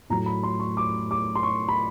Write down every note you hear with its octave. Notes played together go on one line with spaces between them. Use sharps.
A2 F#3 A3 A#5
B5
C6
C#6
D6
D6
C6
C#6
B5